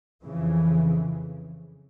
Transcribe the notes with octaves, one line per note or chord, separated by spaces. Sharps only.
F2 C#3 E3